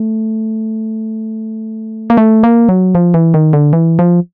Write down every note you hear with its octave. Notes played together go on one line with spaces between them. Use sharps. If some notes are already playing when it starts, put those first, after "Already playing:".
Already playing: A3
A#3
A3
A#3
F#3
F3
E3
D#3
D3
E3
F3